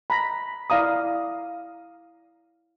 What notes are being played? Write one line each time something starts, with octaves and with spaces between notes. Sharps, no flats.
A#5 B5
E4 D5 F5 A#5 D#6